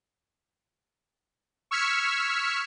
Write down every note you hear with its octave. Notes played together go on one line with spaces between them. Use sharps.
C#6 E6 F6 G#6 B6 C#7